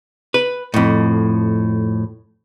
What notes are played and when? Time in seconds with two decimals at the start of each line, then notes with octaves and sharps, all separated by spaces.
0.34 B4
0.74 F2 A2